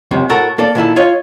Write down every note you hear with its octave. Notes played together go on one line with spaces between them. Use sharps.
C#2 F#2 C3
A2 F#4 A4 A#4 A#5
A#3 A4 D5
A#2 D#3 E4 A4
F4 C#5 D#5